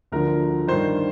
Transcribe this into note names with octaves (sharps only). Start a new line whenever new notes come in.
D2 D3 F3 A#4
G2 D#3 C5